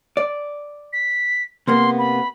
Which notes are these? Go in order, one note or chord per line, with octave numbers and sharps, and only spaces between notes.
D5
B6
C3 A#3 B3 C6
B5